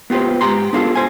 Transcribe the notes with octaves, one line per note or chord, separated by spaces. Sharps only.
B3 F4 G4 B4 C5
G#2 G4 G5 A#5 C6
B3 D4 F4 F#4 G#4 A4
C5 G#5